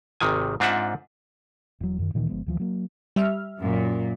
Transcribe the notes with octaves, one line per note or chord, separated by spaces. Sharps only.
G#1 C3 D#3 G#5
G#2 C4 D4 F4 E5 F#5
E1 F#3
F#2 D#3
D1 A#2 D#3 E3
G1 F3 G#3 B3
D2 E3 F3
F#3 A#3
G3 E5 F6
F#2 A#2